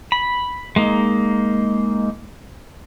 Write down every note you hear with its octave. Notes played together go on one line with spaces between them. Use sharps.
B5
G#3 A#3 D#4